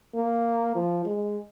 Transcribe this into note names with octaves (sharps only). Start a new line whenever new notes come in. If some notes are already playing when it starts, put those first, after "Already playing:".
A#3
F3
G#3